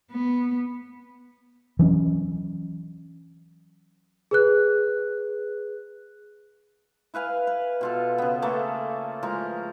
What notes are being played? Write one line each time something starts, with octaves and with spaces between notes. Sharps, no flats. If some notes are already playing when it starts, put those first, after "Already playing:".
B3
E3 F#3 C#4
G#4 B4 F#6
E4 B4 F5 G#5
B4
B2 F4 A4
C#3 B3
A3 A#3 G#4 A4
E3 F3 G#3 A#4